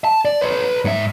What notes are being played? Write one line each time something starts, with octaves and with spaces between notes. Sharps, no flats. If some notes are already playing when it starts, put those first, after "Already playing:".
A5
D5
B4 C#5
G#2 E5